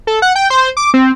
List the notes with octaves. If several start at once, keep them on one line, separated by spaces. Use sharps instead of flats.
A4
F#5
G5
C5
D6
C4